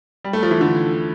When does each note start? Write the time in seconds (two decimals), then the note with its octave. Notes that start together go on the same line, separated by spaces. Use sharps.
0.25 G3
0.33 A3
0.43 F3
0.51 E3
0.61 D3